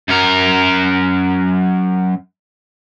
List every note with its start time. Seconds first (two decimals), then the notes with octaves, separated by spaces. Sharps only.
0.08 F#2 A#4